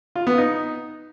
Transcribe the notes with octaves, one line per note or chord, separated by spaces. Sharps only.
F4
B3
D#4